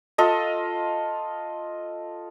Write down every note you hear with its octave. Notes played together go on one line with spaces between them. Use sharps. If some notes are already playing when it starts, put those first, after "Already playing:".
F4 A4 D#5